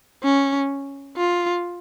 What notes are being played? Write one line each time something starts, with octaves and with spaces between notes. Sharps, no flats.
C#4
F4